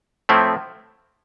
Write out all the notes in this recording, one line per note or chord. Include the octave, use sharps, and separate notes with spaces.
A2 F3 A3 C4 E4